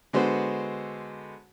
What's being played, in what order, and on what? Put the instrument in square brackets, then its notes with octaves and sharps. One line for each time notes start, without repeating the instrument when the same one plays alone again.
[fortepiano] D3 G#3 B3 F#4 C5